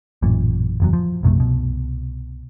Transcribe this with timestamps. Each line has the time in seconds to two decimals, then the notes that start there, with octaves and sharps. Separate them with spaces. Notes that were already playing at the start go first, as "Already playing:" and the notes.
0.22 A1 F#2 A#2
0.80 F#1 E2 F#3
0.93 F3
1.23 B1 F#2 C3 A3
1.38 C2 B2